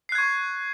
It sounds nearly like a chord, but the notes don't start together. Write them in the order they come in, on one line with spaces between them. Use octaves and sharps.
C7 F#6 G#6 C#6